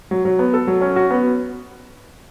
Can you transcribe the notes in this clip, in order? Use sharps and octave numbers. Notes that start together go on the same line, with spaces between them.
F#3
F#3
B3
A4
F#3
C#4
F#4
B3